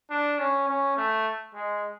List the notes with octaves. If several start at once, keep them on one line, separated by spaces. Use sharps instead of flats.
D4
C#4
C#4
A3
G#3